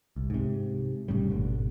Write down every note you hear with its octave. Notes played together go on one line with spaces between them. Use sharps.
C2
G#2 C3
F1 A2 C#3 G3
G#1 B2 D3